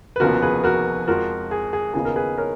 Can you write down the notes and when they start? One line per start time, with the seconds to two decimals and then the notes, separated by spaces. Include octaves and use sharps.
0.16 B4
0.20 F1 D#2 C#3 F3 B3 F#4 A#4
0.42 G#4 B4
0.64 F#4 A#4
1.08 F2 F3 G#3 F#4 A#4
1.51 G#4
1.73 G#4
1.94 D#2 C#3 F3 B3 D#4 G#4
2.05 A#4
2.16 G#4 B4
2.38 A#4 C#5